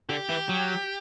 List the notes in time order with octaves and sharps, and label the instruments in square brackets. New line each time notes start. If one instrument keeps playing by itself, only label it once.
[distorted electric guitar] D3 [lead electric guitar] G4
[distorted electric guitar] E3
F#3